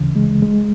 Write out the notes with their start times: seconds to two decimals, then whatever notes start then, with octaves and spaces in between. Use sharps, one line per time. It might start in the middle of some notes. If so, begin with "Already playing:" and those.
Already playing: D2 C#3 E3
0.16 G#3
0.42 G#3